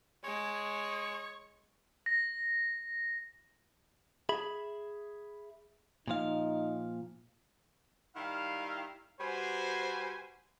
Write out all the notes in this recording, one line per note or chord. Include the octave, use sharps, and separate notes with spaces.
G#3 C#5
A#6
G#4 E5 B5
A#2 F3 D#4 F5
D#3 G3 E4 F5
G3 F#4 B4 C5 G#5